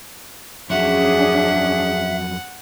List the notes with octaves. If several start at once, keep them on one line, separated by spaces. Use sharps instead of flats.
F2 F#3 C#4 D4 G#4 E5 F#5